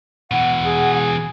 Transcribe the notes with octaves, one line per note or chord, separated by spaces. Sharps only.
B2 E3 F#5
G#4